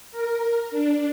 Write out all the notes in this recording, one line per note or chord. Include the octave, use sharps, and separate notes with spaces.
A#4
D4